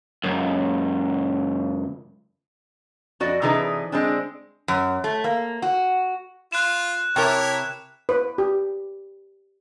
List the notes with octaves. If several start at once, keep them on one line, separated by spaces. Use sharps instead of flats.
C#2 F#2
F2 F#4 D5 D#5
C3 E3 D4 D#4 G#4 B4
G#3 C4 D4
F#2
A3
A#3
F#4
F4 F#6 E7
C3 E4 A#4 C#5 G5 A5 D6
B4
G4